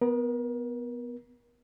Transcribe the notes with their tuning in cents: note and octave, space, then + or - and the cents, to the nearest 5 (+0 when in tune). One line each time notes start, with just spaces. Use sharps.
B3 +0 A#4 +35